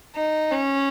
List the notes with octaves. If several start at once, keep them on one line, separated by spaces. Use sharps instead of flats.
D#4
C#4